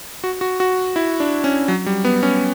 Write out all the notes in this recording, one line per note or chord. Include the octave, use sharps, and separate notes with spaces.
F#4
F#4
F#4
E4
D4
C#4
F#3
G3
B3
C#4